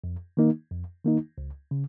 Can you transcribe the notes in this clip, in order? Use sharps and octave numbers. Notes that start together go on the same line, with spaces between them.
F2
D#3 A#3 D#4
F2
D#3 A#3 D#4
C#2
C#3